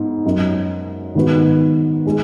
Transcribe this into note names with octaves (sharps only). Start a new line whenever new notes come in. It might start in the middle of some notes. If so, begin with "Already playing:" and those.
Already playing: G#2 B3
F#2 F#3 D#4
G#2 D#3 B3 F#4 B4
G#3 D#4